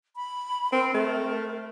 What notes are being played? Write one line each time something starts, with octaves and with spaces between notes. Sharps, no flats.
B5
C4 A#4
A3